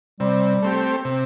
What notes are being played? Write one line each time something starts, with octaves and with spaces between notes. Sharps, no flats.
C3 G3
A3 C4 G4
C3